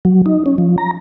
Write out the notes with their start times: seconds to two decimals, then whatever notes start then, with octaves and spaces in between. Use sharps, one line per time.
0.05 F#3
0.26 D#4
0.46 C#4
0.58 F3
0.78 A#5